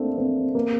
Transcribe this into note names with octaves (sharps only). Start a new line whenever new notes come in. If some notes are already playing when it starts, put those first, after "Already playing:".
Already playing: A3 A#3 C4 D4
C4
A#3